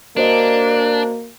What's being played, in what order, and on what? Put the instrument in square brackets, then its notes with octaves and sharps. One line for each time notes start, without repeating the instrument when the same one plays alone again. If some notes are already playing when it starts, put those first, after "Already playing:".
[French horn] A#3 [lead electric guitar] D4 [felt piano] F#4 C5 D#5